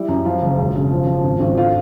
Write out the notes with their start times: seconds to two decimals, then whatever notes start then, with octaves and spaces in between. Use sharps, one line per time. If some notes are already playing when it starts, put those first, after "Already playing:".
Already playing: G3 E4
0.08 F#2
0.25 F3 F4
0.42 F#1
0.58 E1
0.75 C#3
0.91 F3
1.07 F3
1.24 G#1
1.40 G#1
1.56 D3 F4